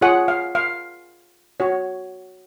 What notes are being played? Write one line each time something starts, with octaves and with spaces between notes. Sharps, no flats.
F4 G#4 C#5 F#5
F5
F5
F#4 C#5